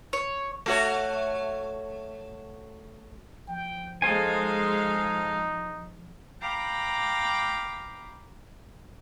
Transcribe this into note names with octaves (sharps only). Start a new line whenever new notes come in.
C#5
A3 F#4 C#5
F3 G5
G#3 D#4 A4 C5 F5 G#5
F5 G5 A#5 B5 D6